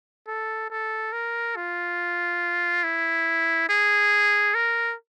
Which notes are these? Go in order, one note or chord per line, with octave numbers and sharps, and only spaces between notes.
A4
A4
A#4
F4
E4
G#4
A#4